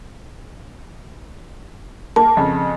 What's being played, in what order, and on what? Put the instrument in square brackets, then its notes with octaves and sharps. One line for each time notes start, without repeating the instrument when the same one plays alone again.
[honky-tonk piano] A#3 [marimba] A5
[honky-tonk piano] F2 C#3